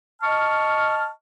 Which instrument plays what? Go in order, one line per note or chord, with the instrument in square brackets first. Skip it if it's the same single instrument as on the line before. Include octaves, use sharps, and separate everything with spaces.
[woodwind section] D#5 A5 C#6 F6